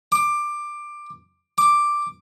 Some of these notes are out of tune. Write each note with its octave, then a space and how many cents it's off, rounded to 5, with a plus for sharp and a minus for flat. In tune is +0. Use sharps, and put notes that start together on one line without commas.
D6 +15
D6 +5